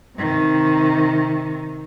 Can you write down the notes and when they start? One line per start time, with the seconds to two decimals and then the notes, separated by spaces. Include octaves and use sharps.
0.17 C3 D#3